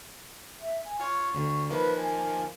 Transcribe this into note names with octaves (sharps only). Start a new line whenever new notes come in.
E5
G#5
F4 C#5 C#6
D2 D3
D#3 F3 A#3 B4
G#5